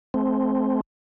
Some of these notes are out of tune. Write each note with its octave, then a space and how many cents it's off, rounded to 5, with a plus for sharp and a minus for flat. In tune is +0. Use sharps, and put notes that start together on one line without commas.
A3 -35 C4 +0